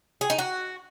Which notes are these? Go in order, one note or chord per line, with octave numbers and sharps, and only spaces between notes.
G#4
D#4
F#4